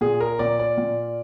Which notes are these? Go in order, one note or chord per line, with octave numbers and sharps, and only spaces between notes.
A#2 G#4
A#4
A#2 D5
D5
A#2